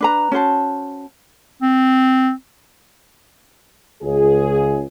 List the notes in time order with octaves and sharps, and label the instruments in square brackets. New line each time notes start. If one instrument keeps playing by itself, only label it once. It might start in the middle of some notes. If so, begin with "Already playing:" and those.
[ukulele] D4 B4 A#5
C#4 F#4 C5 A5
[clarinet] C4
[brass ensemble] C#2 G#4